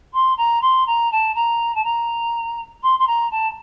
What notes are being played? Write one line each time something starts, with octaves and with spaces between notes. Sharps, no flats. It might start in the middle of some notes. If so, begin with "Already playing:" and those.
C6
A#5
C6
A#5
A5
A#5
A5
A#5
C6
C6
A#5
A5